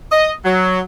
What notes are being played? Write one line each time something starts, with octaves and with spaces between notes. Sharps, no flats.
D#5
F#3